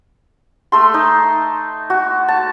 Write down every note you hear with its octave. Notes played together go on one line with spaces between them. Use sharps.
A3 A4 C6
D#4
F#4
A5